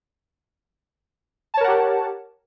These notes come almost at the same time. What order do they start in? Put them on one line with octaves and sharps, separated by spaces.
A5 C#5 A#4 F#5 G4